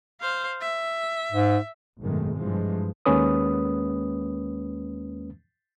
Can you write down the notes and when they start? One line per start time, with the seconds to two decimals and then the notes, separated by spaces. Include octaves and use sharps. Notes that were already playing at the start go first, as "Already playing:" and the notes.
0.21 C5 F5
0.61 E5
1.32 G#2
2.01 G#1 F#2 B2 D#3 G#3 A3
2.37 G2 E3 F3 G#3
3.06 D#2 G#3 A#3 C#4 B4 D#6